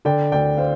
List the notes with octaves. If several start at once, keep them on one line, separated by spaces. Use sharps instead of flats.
D3 D5 G5
D2 D5 G5
C5 F5